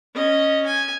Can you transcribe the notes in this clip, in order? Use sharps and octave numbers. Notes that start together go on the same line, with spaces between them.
C#4 D#5
G#5